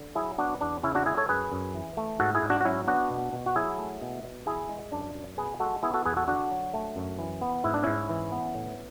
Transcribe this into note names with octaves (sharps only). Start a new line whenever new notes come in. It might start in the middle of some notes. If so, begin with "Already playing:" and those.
Already playing: D3
F#3 E4 G#4
B3 D4 F#4
E2 D4
C#3 C#4 E4
D4 F#4
G#3 E4 G#4
A4 C#5
F#2 G#4 B4
F#2
E3
A3
G#2 F#4 A4
E4 G#4
G#2
D4 F#4
F#4
F#3 C#4 E4
B3 D4 F#4
B2
B2
F#4
F#3 E4 G#4
A3
B2
B2
E3 E4 G#4
G#3
F#2 D4
F#2
B2 G#4 B4
G#3 F#4 A4
B3 E4 G#4
F#4 A4
E2 G#4 B4
F#4 A4
D3 D4 F#4
F#3
A3
F#2
E3
B3
G#2 E4
D4
G#2 C#4 E4
E3
B3
A2